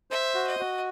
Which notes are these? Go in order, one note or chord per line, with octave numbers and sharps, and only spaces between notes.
C5 E5
F#4
D#5
F#4